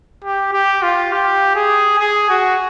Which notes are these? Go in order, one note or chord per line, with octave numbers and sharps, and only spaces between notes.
G4
G4
F4
G4
G#4
G#4
F#4